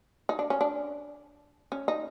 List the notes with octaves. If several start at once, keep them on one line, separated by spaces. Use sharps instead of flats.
D#4
D4
C#4
D4
C#4
D#4